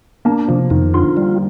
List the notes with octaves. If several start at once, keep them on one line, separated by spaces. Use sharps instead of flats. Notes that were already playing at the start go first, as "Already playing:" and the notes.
A#3 D4
C3 F3
F2 D#3
D3 F4
G3